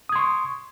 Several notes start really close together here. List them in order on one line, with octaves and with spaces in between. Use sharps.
D#6 G#6 C6 C#6